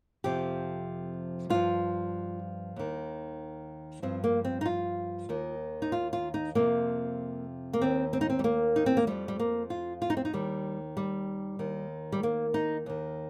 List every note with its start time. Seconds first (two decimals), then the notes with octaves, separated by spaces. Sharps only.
0.24 F2 C3 F3 G4
1.50 G2 F3 F4
2.76 D#2 D#3
4.02 G2 F3 C4
4.24 A#3
4.45 C4
4.61 D#4
4.66 F4
5.29 D#2 D#3
5.82 D#4
5.92 F4
6.13 F4
6.34 D#4
6.55 F2 C3 F3 A#3
7.73 A#3
7.81 D#2 D#3 C4
8.13 C4
8.21 D#4
8.29 C4
8.39 G3
8.44 A#3
8.76 D#4
8.86 C4
8.97 A#3
9.07 F2 F3 G3
9.28 G3
9.39 A#3
9.70 F4
10.02 F4
10.10 D#4
10.17 C4
10.25 D#4
10.33 D#2 D#3 G3
10.97 G3
11.59 D#2 D#3
12.12 G3
12.23 A#3
12.54 D#4
12.86 D#2 D#3